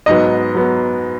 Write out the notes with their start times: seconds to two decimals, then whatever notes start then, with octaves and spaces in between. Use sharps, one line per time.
0.06 G#2 F#3 B3 D#5
0.55 F#3 B3